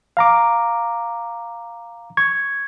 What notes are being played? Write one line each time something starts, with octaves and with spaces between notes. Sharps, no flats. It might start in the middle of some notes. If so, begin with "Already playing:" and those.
F5 A#5 D6
C#6 G#6